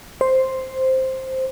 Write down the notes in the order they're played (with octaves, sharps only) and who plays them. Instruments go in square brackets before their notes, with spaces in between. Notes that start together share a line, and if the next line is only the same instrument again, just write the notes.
[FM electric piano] C5